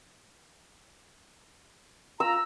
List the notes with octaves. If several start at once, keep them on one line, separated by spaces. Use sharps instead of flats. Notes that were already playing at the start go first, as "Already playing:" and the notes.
F4 A#5 E6